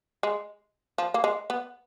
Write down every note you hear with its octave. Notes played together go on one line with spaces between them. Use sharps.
G#3
F3
A#3
G#3
B3